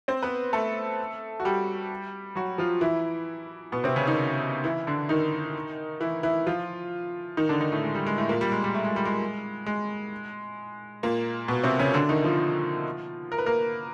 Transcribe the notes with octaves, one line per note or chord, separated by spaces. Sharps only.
C4 C5
B3 B4
A3 A4
F#4
G3 G4
F#3 F#4
F3 F4
E3 E4
B2 B3
C3 C4
C#3 C#4
D#3 D#4
E3 E4
D3 D4
D#3 D#4
E3 E4
E3 E4
F3 F4
D#3 D#4
D3 D4
D#3 D#4
A2 A3
G#3
G3
G#3
A2 A3
A#2 A#3
G3
G#3
G3
A3
G#3
G3
G#3
G#3
A#2 A#3
B2 B3
C3 C4
C#3 C#4
D3 D4
D#3 D#4
F3 F4
A#4
B4
A#3 A#4